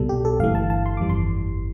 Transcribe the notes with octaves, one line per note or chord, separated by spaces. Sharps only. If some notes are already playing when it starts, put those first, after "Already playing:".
Already playing: C2 B2 G3 A4
G4
A4
G1 G2 E3 A3 F5
A5
A5
C6
G1 F2 E3 G3 D6
C6